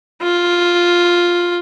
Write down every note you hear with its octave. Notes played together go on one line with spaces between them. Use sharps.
F4